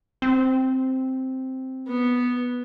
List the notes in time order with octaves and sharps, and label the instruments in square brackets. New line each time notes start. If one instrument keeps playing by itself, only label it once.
[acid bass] C4
[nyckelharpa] B3